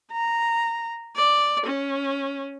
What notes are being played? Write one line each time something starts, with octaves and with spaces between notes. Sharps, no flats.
A#5
D5
C#4